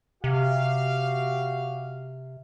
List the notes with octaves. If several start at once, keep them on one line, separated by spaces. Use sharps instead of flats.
C3 F#4 G4 F5